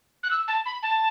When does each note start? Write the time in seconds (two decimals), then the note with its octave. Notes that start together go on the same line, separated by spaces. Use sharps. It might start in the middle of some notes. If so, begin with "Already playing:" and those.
0.23 F#6
0.31 E6
0.48 A5
0.66 B5
0.83 A5